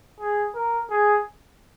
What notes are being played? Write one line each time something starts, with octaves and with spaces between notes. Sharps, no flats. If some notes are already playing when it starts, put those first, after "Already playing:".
G#4
A#4
G#4